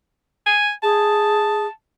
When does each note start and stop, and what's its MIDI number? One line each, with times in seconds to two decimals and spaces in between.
0.46 0.71 80
0.83 1.67 68
0.83 1.69 81